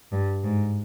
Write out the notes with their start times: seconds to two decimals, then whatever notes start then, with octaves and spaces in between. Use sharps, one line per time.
0.12 G2
0.43 G#2